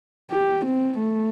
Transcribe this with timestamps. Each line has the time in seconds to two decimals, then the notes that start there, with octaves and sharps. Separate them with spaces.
0.31 G4
0.65 C4
0.98 A3